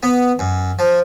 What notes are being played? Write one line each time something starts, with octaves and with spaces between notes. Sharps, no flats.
B3
F#2
F3